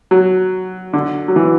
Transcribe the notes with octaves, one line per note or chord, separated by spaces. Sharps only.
F#3
D3
F#3
E3